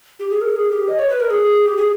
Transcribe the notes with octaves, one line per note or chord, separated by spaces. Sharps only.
G4
G#4
A#4
G#4
G4
D#5
C#5
B4
A#4
G#4
G4
G#4